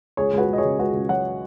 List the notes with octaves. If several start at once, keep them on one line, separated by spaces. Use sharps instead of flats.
C#2 G#4 C#5
C#2 F#4 B4
C#2
D#5
G#4 C#5
C#3
C#2 F#4 B4
C#2
F#3 C#5 F#5